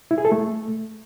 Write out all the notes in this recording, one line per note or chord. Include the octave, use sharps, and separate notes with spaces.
E4
G#4
A4
A3